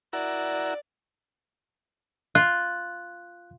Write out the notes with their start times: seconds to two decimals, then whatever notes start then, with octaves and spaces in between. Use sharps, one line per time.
0.13 E4 F#4 A#4 D5
2.35 F4 F#6